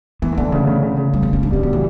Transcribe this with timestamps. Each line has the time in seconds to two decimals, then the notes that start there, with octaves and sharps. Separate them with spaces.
0.22 E3 B3
0.33 E3
0.37 D3 B3
0.52 C#3 A3
0.67 C#3
0.83 C#3
0.97 C#3
1.14 G3
1.23 B3
1.33 C#4
1.43 D4
1.51 G3 C#4
1.63 F#3 B3
1.73 E3 A3